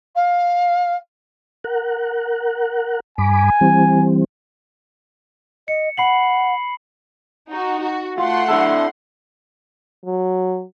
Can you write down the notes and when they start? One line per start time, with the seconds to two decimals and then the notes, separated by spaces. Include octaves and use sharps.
0.15 F5
1.64 A#4 F#5
3.18 G2 G#5 B5 D6
3.61 E3 G3 C4
5.68 D#5 C#7
5.97 F#5 B5 C7 F#7
7.49 D#4 F#4
7.81 F#4
8.18 A3 F4 F#5 C6
8.48 D4 E4 A4
10.06 F#3